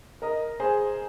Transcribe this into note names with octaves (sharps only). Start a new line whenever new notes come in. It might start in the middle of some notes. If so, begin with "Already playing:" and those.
A#4 D#5
G#4 C5